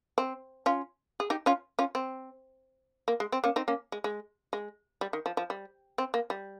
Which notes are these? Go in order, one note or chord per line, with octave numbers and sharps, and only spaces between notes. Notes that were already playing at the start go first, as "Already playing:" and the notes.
C4
C#4 F4
G#4
D#4 G4
C#4 F4
C#4 F4
C4
A#3
G#3
C4
A#3 C#4
C4 D#4
A#3 C#4
G#3
G#3
G#3
G3
D#3
F3
F3
G3
C4
A#3
G3